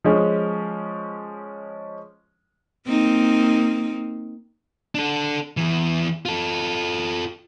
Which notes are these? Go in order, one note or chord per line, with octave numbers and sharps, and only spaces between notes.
F3 G#3 C#4
A#3 C4 D#4
D4 A4
E2 E3
F4 A4